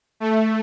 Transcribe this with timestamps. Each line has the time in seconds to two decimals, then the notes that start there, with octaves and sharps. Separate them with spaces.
0.20 A3